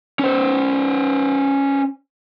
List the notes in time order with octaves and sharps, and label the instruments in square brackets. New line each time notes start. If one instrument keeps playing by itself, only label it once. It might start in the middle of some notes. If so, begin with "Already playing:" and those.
[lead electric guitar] C#4 C5